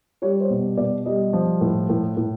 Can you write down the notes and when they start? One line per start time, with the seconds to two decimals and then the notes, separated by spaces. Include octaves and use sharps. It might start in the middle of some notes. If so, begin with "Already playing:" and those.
0.22 G3 C#5
0.41 C5
0.50 B2
0.77 B2 D5
1.06 G3 D#5
1.33 F3
1.61 A2
1.89 A2
2.17 A2